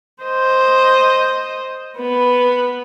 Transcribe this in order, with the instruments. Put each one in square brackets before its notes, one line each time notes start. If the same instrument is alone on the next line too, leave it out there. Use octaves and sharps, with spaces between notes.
[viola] C5 D#5
B3 B4